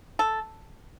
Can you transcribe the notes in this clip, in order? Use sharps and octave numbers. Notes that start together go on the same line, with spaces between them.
A4